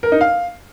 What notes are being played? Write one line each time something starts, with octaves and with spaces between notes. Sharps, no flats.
A#4
D#4
F5